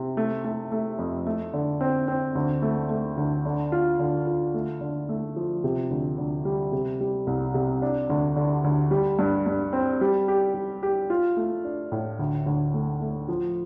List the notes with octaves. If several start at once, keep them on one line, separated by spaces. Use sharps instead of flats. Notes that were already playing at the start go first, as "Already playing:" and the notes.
Already playing: C3
A3
A3
A3
F2
A3
D3
C4
C4
D2
A3
A3
D2
D3
F4
D3
F4
A3
D3
A3
F3
C3
D2
D2
G3
C3
G3
C2
C3
D4
D2
D3
D2
G3
G2
G2
C4
G3
G4
G3
G4
F4
A3
D4
A2
D2
D2
A3
A3
F3